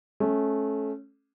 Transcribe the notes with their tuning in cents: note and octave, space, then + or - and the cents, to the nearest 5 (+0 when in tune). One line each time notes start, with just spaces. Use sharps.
A3 -25 C#4 -15